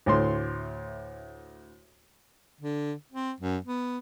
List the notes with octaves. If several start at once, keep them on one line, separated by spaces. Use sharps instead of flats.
D2 A2 C6
D3
C4
F#2
B3